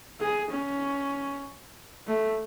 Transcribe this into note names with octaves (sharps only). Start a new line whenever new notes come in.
G#4
C#4
A3